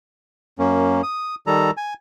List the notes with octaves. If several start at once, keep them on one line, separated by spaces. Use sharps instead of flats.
F#2 A#3 C#4
D#6
D#3 G3 A4 A#5
G#5